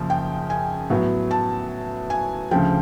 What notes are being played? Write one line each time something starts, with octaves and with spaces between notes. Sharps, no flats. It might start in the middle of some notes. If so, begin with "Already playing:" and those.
Already playing: F#2 C#3 F3 A#3
G5
G#5
A2 F#3 B3
A5
G#5
D2 C#3 F3 G5